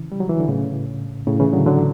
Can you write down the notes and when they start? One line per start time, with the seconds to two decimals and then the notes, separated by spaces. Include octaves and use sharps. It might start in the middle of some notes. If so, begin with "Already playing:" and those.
Already playing: C#3 E3
0.12 G3
0.20 F#3
0.29 E3
0.40 D3
0.48 A2 C#3
1.27 A2 C#3
1.40 C#3 E3
1.53 D3 F#3
1.66 D3 F#3